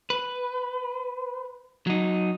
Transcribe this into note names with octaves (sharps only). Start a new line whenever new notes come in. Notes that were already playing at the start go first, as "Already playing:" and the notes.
B4
F#3 D#4